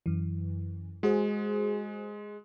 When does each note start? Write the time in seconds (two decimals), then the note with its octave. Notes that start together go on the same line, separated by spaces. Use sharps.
0.06 F#2 E3
1.03 G#3 F#4 G#4 C5